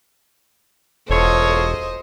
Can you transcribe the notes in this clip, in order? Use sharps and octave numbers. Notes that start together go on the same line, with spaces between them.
E1 F4 A4 C5 C#5 D#5